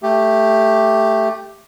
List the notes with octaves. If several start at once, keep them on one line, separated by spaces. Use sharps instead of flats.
A3 G4